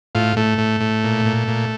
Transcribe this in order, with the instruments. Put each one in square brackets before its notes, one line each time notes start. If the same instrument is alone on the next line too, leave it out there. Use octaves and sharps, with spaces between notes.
[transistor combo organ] A2 F4
A2 A3
A2
A2
A#2
A#2
A#2